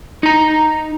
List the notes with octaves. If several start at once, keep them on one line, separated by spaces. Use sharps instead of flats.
D#4 A#5